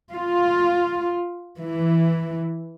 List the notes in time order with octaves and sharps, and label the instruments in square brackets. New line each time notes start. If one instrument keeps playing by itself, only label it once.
[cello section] F4
E3